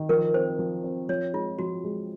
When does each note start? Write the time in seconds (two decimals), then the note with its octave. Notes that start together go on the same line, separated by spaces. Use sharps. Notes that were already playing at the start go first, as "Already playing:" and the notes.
Already playing: D#3
0.09 F3 A#4
0.34 C4 C5
0.59 F3
0.84 C4
1.09 F3 C#5
1.34 G#3 F4
1.59 F3 F#4
1.84 G#3